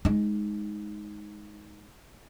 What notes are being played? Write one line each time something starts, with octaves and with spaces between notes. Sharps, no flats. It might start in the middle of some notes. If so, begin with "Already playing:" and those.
G#3 D#4